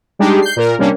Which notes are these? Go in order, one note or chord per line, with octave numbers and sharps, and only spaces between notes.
G3 G#3 D4 D#4 G4
G6 C7
A#2 A#4
C3 G3 A#3 C#4 D4